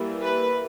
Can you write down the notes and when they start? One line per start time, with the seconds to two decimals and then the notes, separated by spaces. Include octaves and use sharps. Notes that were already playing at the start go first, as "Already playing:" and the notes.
Already playing: E3 G3 A#3
0.25 B4